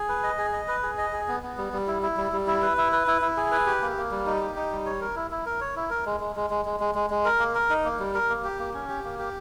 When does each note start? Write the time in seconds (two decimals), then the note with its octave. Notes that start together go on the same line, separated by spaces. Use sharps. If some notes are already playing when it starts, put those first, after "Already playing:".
Already playing: G#4
0.09 B4
0.23 D#5
0.38 G#4
0.53 D#5
0.68 B4
0.83 G#4
0.98 D#5
1.12 G#4
1.28 B3
1.43 B3
1.58 G3
1.73 G3
1.88 E4
2.03 E4
2.17 G3
2.32 G3
2.47 E4
2.62 B4
2.77 E4
2.92 B4
3.07 E4
3.22 E4
3.37 G#4
3.52 B4
3.66 G4
3.81 A#3
3.97 A#3
4.11 G3
4.26 D#4
4.41 G4
4.56 D#4
4.71 G3
4.86 C#5
5.01 A#4
5.16 E4
5.31 E4
5.46 A#4
5.61 C#5
5.76 E4
5.90 A#4
6.06 G#3
6.20 G#3
6.36 G#3
6.50 G#3
6.65 G#3
6.80 G#3
6.95 G#3
7.10 G#3
7.25 A#4
7.39 A#3
7.55 A#4
7.70 D#4
7.85 A#3
8.00 G3
8.14 A#4
8.29 A#3
8.44 G4
8.59 A#3
8.74 C#4
8.89 G4
9.04 A#3
9.19 G4